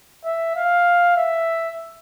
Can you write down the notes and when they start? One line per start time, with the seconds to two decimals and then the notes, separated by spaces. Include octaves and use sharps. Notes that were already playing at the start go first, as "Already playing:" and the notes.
0.25 E5
0.56 F5
1.17 E5